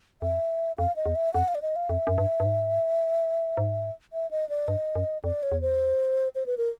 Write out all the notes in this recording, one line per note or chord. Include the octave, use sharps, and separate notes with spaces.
F2 E5
F2 F5
D#5
E2
E5
F2 F#5
F5
D5
D#5
F5
F2 E5
F#2
G2
G2
G#2
G#2
E5
D#5
D5
G2 D#5
F#2
F2 D5
C#5
E2
C5
C5
B4
A#4